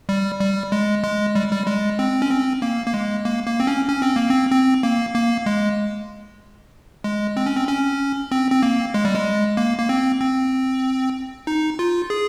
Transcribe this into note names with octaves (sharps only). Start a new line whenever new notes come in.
G3
G3
G#3
G#3
G3
G3
G#3
C4
C#4
C4
A#3
A#3
G#3
A#3
A#3
C4
C#4
C#4
C4
A#3
C4
C4
A#3
A#3
G#3
G#3
C4
C#4
C4
C#4
C4
C4
A#3
G#3
G3
G#3
A#3
A#3
C4
C4
D#4
F4
G#4